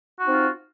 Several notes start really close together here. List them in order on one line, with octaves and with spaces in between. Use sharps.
F#4 D#4 C4 F4